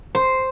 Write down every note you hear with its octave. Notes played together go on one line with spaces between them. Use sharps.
C5